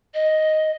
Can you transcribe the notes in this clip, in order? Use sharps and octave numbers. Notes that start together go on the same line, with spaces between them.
D#5